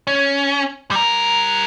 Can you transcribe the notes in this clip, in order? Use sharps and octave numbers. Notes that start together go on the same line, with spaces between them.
C#4
G3 A#4